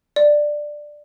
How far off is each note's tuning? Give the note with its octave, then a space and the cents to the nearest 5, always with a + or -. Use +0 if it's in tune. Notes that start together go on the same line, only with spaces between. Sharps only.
D5 +10